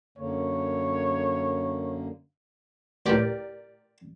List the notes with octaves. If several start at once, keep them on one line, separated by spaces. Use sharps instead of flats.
F#2 D3 A#3 C#5
C#2 A2 G4 A#4 D5